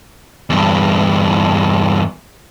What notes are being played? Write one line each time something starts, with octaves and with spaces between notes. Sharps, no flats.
E2 G2